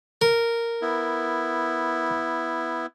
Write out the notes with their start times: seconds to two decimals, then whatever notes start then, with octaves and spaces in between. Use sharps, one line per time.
0.22 A#4
0.82 B3 E4